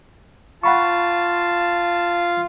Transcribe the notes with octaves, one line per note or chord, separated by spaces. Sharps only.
F4 F#5 A5 B5 C#6